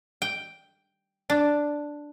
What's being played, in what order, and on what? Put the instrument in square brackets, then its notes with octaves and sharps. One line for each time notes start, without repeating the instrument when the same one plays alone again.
[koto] G5
D4